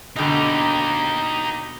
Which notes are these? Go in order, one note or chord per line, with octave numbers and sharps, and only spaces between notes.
B2 D3 D#4 G4 A4